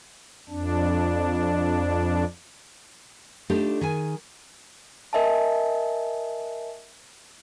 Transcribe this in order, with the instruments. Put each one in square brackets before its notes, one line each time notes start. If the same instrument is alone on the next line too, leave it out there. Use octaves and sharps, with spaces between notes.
[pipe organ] F2 D4
[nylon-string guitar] A3 D4 D#4 F4 G4 A4
D#3 G#4 G#5
[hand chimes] A#4 D#5 E5 G#5 A5